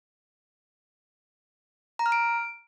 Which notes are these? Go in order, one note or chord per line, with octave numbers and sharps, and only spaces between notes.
A#5
F6
D7